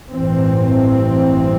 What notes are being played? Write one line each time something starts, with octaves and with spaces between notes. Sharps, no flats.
A1 G2 E3 C4